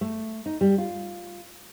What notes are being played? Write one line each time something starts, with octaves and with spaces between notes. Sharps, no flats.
A3
D#4
G3
F4